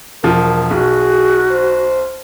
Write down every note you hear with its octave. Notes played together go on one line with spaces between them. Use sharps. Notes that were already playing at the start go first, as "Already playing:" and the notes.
E1 F3 A#4
B1 F#4 G#4
C5